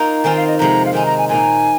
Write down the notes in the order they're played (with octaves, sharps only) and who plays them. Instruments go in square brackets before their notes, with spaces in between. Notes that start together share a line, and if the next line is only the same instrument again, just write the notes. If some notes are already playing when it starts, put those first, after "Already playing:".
Already playing: [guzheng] A#3 D#4 F4
[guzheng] D#3 C4 F4 [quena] G#5
[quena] F5
D#5
[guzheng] F2 C3 G#3 [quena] A#5
[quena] F5
[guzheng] D#3 C4 D#4 [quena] G#5
[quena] A#5
G#5
[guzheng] A#2 A#3 D#4 [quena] G#5